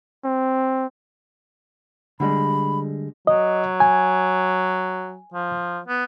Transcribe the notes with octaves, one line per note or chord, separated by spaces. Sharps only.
C4
D3 G3 G#3 B5
F#3 D#5
G#5
F3
B3